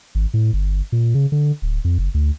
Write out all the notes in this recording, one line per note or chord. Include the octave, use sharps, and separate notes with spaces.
G#1
A2
G1
A#2
C#3
D3
D1
F2
F#1
D2